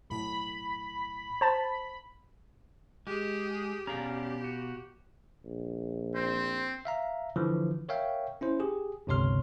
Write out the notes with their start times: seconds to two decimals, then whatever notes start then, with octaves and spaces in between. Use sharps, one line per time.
0.10 B1 A2 B5
1.41 C5 A5 A6
3.07 G#3 G4 G#4
3.87 B2 C#4 G4 D5 F5 A#5
4.44 F#4
5.44 A#1
6.15 C4 C5
6.85 E5 F5 A#5
7.36 D3 E3 F3
7.89 A#4 C#5 E5 F5 G5
8.41 C#4 E4 C5
8.60 G4 G#4
9.07 G1 C#2 C3 C#5 C6 F6